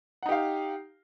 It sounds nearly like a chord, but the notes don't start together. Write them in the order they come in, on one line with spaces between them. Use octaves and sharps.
F#5 D#4 G4 F5